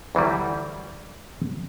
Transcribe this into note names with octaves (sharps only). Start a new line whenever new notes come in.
D2 E3 F#3 G3